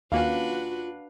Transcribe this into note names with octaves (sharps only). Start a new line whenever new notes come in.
D#2 A#3 C#4 D4 F4 F#4 B4 F5